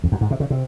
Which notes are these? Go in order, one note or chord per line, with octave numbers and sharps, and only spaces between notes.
F2
F#2
G#2
C3
C#3
C3